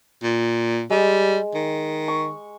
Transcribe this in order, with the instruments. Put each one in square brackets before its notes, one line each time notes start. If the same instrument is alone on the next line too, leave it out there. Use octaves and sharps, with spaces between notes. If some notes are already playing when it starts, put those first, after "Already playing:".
[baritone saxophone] A#2
[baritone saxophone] G3 [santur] G#3
[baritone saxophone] D#3
[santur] C#6